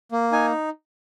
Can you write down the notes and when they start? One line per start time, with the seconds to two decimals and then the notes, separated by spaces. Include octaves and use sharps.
0.12 A#3
0.32 D#4 G#5